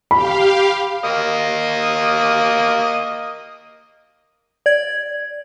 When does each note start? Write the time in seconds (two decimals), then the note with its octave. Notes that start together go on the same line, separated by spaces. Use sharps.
0.11 G4 F5 B5
1.04 A#3 D#5
4.66 D5 G#6